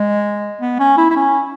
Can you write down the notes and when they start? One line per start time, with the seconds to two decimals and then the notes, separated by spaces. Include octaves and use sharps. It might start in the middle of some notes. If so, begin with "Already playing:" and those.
Already playing: G#3
0.61 B3
0.79 C#4
0.97 E4
1.10 E4
1.16 C#4